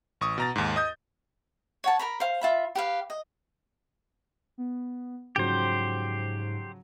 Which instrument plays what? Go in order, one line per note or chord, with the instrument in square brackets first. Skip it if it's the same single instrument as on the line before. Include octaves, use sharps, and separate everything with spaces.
[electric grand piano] A1 C#6 D#6
B2 A#5 A6
D#2 G#2
D#5 D#6 G6
[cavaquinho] C#5 F#5 A5
A#4 A#5 B5
C5 F5
F4 E5 B5
G4 B4 F5
D#5
[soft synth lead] B3
[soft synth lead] G#2 [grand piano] C#3 F3 F#3 [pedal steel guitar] G4 C5